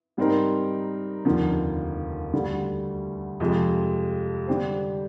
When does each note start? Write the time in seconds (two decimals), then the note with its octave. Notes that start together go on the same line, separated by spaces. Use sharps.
0.17 G#2 G3 C4 D#4 A#4
1.25 F1 D#2 D3 F3 A#3
2.33 D2 D3 G3
3.40 F2 C3 F3 G#3
4.47 D3 G3 D4 G4 C5